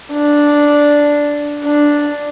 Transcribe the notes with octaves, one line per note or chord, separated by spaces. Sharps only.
D4
D4